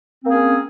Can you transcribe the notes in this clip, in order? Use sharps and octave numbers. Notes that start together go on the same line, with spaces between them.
A#3 C4 C#4 G#4